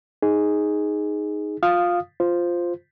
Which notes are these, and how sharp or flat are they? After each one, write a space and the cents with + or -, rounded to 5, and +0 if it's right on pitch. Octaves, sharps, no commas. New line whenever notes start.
D#4 +0 G#4 +0
F4 +20 F5 +0 D#6 -15
F4 +0 C5 +0